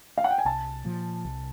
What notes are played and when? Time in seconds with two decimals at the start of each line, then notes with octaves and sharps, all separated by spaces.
0.18 F5
0.24 F#5
0.31 G5
0.38 G#5
0.45 C2 A5
0.84 A#2 F3
1.25 C2